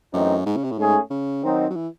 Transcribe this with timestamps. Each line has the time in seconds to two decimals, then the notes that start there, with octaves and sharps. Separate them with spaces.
0.13 F#2 E3 A3 C4 D#4
0.46 G#2
0.56 C#3
0.64 C3
0.71 A2
0.78 G#2 A3 C#4 G#4
1.10 C#3
1.44 D#3 F#3 C4 D#4
1.70 F#3
1.76 E3